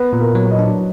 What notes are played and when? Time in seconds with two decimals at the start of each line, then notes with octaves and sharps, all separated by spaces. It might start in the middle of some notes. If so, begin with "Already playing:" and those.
Already playing: B3 B4
0.13 A#2
0.20 A#4
0.35 F#3
0.51 D#5
0.59 D4